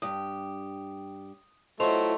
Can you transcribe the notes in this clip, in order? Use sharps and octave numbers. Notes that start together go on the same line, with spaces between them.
G2 G4 D#6
F#3 A3 E4 F4 C5 D#5 C6 F7